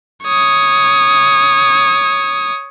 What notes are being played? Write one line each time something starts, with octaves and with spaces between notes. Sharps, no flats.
C#5 D#6